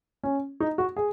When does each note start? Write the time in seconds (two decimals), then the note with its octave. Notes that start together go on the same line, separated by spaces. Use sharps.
0.23 C#4
0.60 D#4
0.78 F#4
0.97 G#4